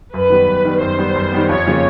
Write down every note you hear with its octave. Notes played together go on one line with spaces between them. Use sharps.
F#2 B4
D#3 G3 B3
F#2
D#3 G3 B3
F#2 C5
D#3 G3 B3
F#2
D#3 G3 B3
F2 C#5
C#3 F3 A#3 C#4